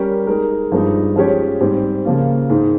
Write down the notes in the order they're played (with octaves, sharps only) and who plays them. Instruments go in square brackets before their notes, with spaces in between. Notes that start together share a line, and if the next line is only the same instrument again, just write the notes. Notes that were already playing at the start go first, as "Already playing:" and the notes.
Already playing: [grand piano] G3 C#4 G4 A#4
G#3 D#4 A#4
G2 F3 G#3 D#4
F3 G#3 C#4 G4 C#5
G#2 G3 C4 G4
C#3 F3 A#3 F4
G#2 D#3 G#3 D#4